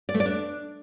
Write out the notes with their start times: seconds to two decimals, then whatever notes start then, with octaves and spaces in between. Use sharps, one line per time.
0.09 D5
0.14 A3
0.20 D5
0.26 D4